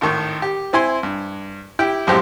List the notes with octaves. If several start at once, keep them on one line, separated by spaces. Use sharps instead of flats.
G#1 A2 D#3 C#6
G4
C4 E4 G#5 C6
G2
E4 G4 G5
A#1 F#2 A2 G#3 C4 G4